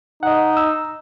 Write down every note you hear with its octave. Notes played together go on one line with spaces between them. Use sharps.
D#4 D#5 F#5
E6